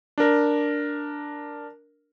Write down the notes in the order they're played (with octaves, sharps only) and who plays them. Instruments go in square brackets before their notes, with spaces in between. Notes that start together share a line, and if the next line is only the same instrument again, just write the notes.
[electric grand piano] D4 A#4